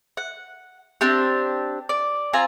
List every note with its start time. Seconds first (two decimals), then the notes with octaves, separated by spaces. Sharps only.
0.17 F#5
1.01 C4 D4 G4
1.89 D5
2.33 C4 F4 G#5 A#5